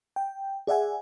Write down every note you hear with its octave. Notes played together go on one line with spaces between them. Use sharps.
G5
G#4 D5 E5 F#5 G#5